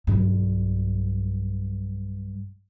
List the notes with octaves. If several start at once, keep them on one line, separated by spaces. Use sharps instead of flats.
B1 G2